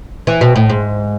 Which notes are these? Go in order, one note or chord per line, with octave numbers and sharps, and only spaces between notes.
E3
B2
A2
G#2